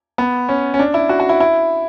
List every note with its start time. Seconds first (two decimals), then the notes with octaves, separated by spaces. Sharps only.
0.18 B3
0.49 C#4
0.74 C#4
0.79 D4
0.94 E4
1.09 F#4
1.20 F#4
1.29 E4
1.40 E4